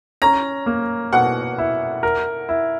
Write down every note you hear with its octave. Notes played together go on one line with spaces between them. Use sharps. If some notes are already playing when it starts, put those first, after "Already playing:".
C#4 A#5
A#3
B2 F#5
E4
A#4
E4